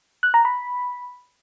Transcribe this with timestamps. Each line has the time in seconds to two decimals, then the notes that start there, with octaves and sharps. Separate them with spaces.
0.23 F#6
0.34 A#5
0.45 B5